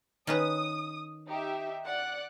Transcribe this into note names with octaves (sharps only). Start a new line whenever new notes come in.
D#3 C#4 B4 D#6
D#4 G4 E5
D5 F#5 F#6